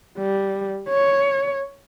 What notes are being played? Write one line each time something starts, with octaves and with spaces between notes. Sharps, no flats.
G3
C#5